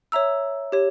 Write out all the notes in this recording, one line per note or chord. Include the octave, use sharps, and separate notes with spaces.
C#5 E5 A#5 E6
G4 C#5